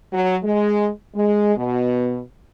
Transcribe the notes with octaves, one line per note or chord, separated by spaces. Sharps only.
F#3
G#3
G#3
B2